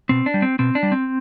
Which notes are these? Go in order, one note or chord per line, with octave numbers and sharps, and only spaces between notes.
B2 C4
D4
G3
C4
B2 C4
D4
G3
C4